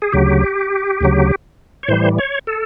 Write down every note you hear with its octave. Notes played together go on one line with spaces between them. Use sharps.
G#4
D2 C#3 F#3 G4
D2 C#3 F#3
C#5
A2 E3 G3 C5
C#5
A4